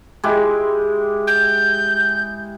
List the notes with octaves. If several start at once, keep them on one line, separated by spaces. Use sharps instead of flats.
G#3 E4 G4
G6